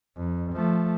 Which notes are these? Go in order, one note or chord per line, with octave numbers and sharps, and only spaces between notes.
F2
F3 A3